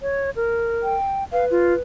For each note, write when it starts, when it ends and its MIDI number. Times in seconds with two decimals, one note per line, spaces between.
0.01 0.30 73
0.36 0.95 70
0.83 1.24 79
1.32 1.82 71
1.32 1.45 77
1.51 1.74 65